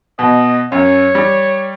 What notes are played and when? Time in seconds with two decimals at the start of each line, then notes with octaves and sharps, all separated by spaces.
0.19 B2 D#5
0.72 F#2 C#5
1.15 G3